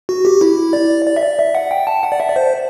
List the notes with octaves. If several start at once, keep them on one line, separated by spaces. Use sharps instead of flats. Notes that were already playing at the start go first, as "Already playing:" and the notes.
F#4
G4
E4
D5
D5
E5
D5
E5
F#5
G5
A5
F#5
D5
E5
D5
C5